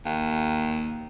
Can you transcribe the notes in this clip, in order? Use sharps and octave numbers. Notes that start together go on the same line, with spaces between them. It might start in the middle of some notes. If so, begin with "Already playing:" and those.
D#2